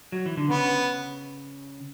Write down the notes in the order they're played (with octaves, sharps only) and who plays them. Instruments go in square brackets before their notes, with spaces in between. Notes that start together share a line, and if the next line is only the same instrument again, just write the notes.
[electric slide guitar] F#3
E3
D3
[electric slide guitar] C#3 [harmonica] B3